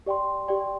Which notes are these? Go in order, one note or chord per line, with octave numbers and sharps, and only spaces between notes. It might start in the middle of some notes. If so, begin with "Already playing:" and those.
G4 D5 G5 C6
G4 D5 G5 C6